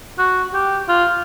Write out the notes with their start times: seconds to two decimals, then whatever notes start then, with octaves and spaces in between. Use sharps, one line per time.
0.19 F#4
0.54 G4
0.89 F4